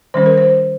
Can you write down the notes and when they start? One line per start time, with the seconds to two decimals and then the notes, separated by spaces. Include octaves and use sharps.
0.14 D#3 G3 C#4 C5
0.26 A#4
0.38 C5